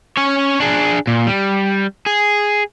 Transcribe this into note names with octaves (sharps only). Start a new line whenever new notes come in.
C#4 C#5
D4 G#4
A#2
G3
G#4